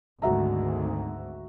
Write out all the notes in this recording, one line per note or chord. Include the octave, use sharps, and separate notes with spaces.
G#1 D2 G#2 F#4 E5 A#5